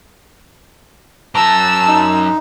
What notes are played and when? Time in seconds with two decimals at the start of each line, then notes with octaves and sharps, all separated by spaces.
1.35 F#2 A5 A#5 E6
1.88 D#4